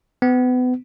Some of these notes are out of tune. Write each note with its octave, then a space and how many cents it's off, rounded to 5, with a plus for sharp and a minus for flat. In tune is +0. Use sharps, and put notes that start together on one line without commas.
B3 +30